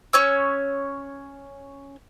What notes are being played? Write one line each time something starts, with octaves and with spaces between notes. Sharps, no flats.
C#4 C#5 E6